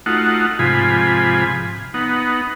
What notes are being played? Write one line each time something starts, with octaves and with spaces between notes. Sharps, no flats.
A3 D#4 F4 F#4 F#5
G#2 C3 F3 F4 G#5 B5
B3 D#4 F#5